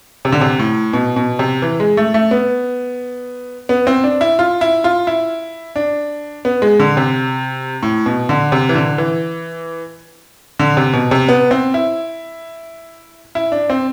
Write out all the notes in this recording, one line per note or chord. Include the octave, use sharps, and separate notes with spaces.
C3
D3
C3
A2
B2
B2
C3
E3
G#3
A3
A3
B3
B3
C4
D4
E4
F4
E4
F4
E4
D4
B3
G#3
D3
C3
A2
B2
D3
C3
E3
D3
E3
D3
C3
B2
C3
B3
C4
E4
E4
D4
C4